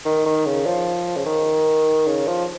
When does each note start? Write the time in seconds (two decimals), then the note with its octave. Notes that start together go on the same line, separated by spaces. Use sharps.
0.05 D#3
0.26 D#3
0.46 C#3
0.66 F3
1.17 C#3
1.26 D#3
2.07 C#3
2.27 F3